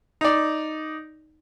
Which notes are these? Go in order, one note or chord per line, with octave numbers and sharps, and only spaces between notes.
D#4 D5